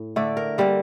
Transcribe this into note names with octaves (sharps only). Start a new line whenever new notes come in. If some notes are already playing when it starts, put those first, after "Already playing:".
Already playing: A2
D3 A3 D5
A#4
D3 G3 A#3